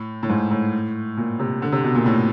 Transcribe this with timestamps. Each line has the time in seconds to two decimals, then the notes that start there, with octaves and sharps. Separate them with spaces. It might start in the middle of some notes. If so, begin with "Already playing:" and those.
Already playing: A2
0.23 A2
0.29 G#2
0.51 A2
1.17 A#2
1.39 C3
1.62 D3
1.72 C3
1.84 B2
1.95 A#2
2.06 A2